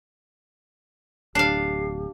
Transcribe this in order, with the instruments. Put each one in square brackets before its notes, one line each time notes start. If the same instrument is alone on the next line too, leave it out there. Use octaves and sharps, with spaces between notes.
[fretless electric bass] D1 [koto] D4 F5 [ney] G4 [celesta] C7